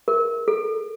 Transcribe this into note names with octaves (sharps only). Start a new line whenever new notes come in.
A#4
A4